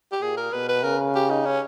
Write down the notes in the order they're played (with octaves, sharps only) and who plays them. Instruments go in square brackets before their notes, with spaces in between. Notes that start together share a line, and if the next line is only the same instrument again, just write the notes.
[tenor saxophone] G4
[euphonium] A#2 [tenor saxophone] G#4
[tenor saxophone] A#4
[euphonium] B2 [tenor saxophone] B4
[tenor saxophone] B4
[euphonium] C#3 [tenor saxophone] A#4
[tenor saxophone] G4
D#4
C#4